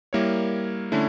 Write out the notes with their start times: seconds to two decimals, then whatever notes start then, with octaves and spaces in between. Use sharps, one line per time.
0.13 G3 A#3 E4 A#4 C#5
0.92 D3 A3 C#4 E4